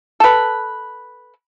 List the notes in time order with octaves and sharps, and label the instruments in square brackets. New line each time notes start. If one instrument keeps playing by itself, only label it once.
[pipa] A4 B4